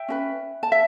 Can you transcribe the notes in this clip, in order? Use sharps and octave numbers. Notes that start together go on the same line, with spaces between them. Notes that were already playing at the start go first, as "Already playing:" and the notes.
Already playing: E5 G5
C#4 G4 B4
A5
E5